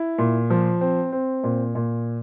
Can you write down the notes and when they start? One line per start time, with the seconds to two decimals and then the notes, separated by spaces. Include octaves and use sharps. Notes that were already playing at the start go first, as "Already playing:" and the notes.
Already playing: E4
0.18 A#2
0.50 F3
0.81 C4
1.12 C4
1.44 A#2
1.75 A#2